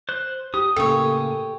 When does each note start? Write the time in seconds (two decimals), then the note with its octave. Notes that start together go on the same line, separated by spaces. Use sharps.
0.09 C5 F#6
0.54 G4 D#6
0.76 A2 C#3 A#3 G4 A4 C#5